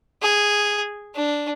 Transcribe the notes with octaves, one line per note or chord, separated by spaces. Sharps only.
G#4
D4